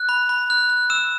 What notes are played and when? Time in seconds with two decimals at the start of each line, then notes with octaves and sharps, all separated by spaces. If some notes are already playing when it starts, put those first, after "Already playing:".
Already playing: F#6
0.09 B5
0.29 B5
0.50 F#6
0.70 F#6
0.90 E6 E7